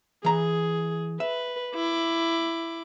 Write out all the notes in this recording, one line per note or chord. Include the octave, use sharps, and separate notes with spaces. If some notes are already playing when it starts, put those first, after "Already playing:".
E3 G#4 A#5
B4 E5
E4 D6